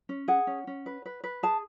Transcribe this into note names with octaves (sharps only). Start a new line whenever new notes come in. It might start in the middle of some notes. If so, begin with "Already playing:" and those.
C#4
G#4 F#5
C#4
C#4
B4
B4
B4
G#4 A5